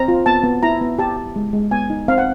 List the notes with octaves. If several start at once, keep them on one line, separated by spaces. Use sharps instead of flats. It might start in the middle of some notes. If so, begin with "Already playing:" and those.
Already playing: C4 A#5
F4
B3 A5
B3
E4 A#5
B3
G4 A5
G4
G#3
G#3
B3 G#5
D#4
C4 F5
F#5